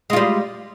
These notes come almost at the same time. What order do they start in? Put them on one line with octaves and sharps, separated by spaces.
G#3 F4 G3